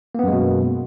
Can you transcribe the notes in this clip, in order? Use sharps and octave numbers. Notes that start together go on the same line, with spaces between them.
F#2 B2 G#3 A#3 B3